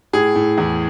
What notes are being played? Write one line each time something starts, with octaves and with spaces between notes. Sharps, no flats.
A2 G#4
A2
E2